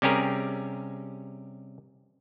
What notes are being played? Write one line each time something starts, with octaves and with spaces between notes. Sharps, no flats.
C3 G3 C#4 G4 G#4 A#4